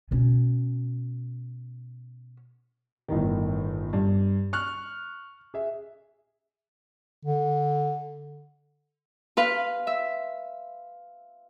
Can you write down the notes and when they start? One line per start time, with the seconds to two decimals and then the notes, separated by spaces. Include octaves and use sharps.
0.11 B2 C#4
3.08 G1 A2 D#3
3.93 G2
4.53 C#6 F6 F#6
5.54 G#4 E5
7.25 D3
9.37 F4 B4 F5
9.87 E5